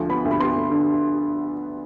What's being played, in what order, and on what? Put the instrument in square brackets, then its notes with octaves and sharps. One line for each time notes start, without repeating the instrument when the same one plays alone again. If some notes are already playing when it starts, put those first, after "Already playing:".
Already playing: [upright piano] D2 F3
B3 B5
D2
B5
B3 C6
D2
D3